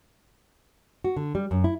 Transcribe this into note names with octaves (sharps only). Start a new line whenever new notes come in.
F#4
D3
G3
F#2
E4